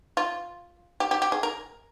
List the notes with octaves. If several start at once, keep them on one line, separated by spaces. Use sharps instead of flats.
F4
G4
G4
G4
G#4
A#4